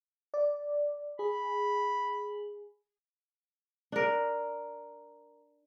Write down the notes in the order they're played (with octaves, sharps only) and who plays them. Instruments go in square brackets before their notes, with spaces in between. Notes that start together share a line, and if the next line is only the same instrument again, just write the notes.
[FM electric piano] D5
[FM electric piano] G#4 [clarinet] B5
[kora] D4 A#4